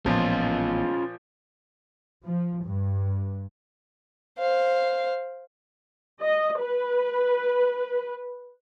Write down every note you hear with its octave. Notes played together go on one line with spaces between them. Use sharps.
A1 A#2 F3 B3 C#4 F4
F3
G2
C5 F5
D#5
B4